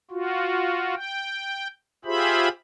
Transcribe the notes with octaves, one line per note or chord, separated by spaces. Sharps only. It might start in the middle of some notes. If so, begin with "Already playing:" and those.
F4 F#4
G5
F4 G4 G#4 C5 E5 B5